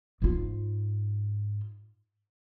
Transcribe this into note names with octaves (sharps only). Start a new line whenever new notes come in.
G#2 F4